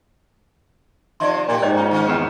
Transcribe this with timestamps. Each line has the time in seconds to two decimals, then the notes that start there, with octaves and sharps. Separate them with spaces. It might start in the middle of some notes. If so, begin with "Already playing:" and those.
1.20 C3 F3 D#4 D5 D#5 C6
1.49 A#2 F#4 G4
1.62 G#2 C5 C#5 D#5
1.77 C#4 F4 A#5
1.91 D#3 F3 C#4
2.08 E2